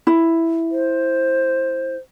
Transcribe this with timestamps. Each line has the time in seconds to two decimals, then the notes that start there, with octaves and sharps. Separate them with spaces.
0.07 E4
0.71 C5